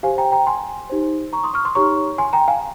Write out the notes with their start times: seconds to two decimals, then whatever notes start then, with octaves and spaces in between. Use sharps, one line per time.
0.03 G4 C5 F5 G#5
0.18 G5 A#5
0.32 G5 A#5
0.47 G#5 C6
0.90 D#4 G4 C5
1.33 A#5 C#6
1.44 C6 D#6
1.54 C#6 F6
1.65 C6 D#6
1.75 D#4 G4 C#5 A#5 C#6
2.18 G#5 C6
2.33 G5 A#5
2.48 F5 G#5